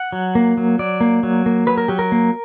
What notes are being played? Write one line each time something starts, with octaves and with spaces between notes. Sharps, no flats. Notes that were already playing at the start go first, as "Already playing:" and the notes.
Already playing: F#5
F#3
A#3
F#3
F#3 D5
A#3
F#3
A#3
F#3 B4
A#4
F#3 G4
A#4
A#3